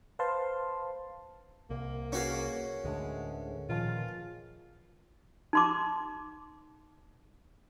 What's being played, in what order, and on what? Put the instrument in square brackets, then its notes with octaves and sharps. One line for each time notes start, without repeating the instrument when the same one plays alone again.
[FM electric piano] B4 C5 F5 A5 C6
[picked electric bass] C2 [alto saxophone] A#3
[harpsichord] C#4 F#4 F5 [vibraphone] G#4 A#4 B4
[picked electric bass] D2 A2 D3 [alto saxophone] G#3
[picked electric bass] A#2 D#3 F3 [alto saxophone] F4
[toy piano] D#4 C6 D6